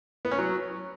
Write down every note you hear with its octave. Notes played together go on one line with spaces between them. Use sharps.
B3
C#4
F#3